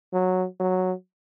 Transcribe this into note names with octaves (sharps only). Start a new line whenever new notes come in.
F#3
F#3